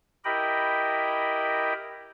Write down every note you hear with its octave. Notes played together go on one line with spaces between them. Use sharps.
E4 G4 A#4 D#5 G5 B5